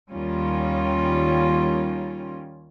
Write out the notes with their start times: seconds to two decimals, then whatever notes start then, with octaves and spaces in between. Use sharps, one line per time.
0.12 D#2 D#3 G3 C#4 F4